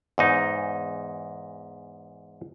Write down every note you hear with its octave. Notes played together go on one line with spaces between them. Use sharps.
E2 G#2 D#4